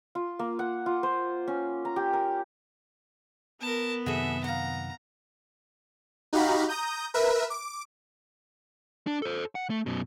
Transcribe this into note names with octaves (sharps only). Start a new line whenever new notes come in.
F4
A#3
F#5
F4
C5
C#4
A#5
G4
A#4
B3 A#4 A5
F#2 C3 D#3 F#4 G#4 A4 E5
F5 F#5 A#5
D#4 F#4 G4 F5 A#5 B5
A#5 D#6 G6
A#4 B4 E5
D6
D4
A4 C5
F#5
A3
F#2 B2